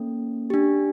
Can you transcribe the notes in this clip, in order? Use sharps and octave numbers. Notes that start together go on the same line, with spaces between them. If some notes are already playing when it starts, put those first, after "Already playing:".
Already playing: A#3 C#4 A4
D4 G4